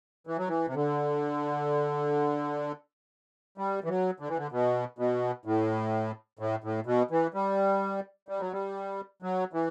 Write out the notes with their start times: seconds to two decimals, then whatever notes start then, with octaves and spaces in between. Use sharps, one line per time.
0.27 E3
0.38 F#3
0.48 E3
0.68 C3
0.74 D3
3.58 G3
3.84 E3
3.89 F#3
4.20 D3
4.29 E3
4.38 D3
4.52 B2
4.99 B2
5.45 A2
6.39 A2
6.64 A2
6.86 B2
7.11 E3
7.34 G3
8.29 G3
8.40 F#3
8.52 G3
9.22 F#3
9.53 E3